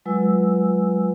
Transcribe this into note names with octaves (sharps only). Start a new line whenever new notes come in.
F#3 G#3 F4 B4 G#5 E6